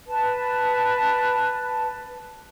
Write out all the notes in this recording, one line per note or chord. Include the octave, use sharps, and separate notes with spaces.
B4 A5